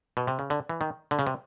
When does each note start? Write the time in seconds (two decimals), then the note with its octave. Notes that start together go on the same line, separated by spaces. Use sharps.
0.17 B2
0.27 C3
0.39 C#3
0.50 D3
0.69 E3
0.81 D#3
1.11 D3
1.19 C#3
1.27 C3